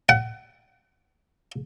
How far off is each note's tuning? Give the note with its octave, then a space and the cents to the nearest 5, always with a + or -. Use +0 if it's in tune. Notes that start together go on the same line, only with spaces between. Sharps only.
F#5 +35